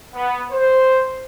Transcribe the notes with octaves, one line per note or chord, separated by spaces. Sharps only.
B3
C5